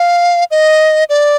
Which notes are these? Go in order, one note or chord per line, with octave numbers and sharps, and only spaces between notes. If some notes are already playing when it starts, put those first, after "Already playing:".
Already playing: F5
D#5
D5